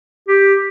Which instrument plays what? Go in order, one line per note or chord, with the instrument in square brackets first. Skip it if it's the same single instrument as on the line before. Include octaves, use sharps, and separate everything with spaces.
[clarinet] G4